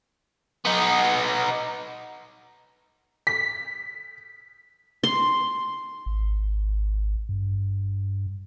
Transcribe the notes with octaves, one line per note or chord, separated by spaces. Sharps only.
B3 D#4
B6
C6
G#1
G2